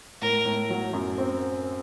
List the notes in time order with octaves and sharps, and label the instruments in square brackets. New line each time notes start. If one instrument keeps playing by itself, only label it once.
[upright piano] A2 [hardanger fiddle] A#4
[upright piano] A2
F#3
F#2
C4